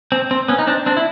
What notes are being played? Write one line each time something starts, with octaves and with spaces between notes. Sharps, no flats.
C4
C4
B3 C#4
D#4
C4 D4
C4 D4
E4